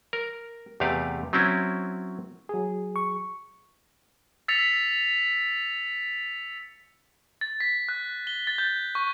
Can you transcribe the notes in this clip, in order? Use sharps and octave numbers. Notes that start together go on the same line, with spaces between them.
A#4
E2 C3 A3 G4 B4 F5
F#3 C4 C#4 E4
F#3 G#4
C#6
E6 A6 B6 C#7 F7
A6
B6
F#6
G7
A6
G6
C#6